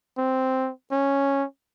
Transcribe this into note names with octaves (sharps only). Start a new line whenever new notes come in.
C4
C#4